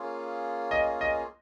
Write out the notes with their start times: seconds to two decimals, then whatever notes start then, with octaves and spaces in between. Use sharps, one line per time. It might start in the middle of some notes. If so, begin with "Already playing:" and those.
Already playing: A#3 C#4 F4 G#4
0.71 D#5
1.01 D#5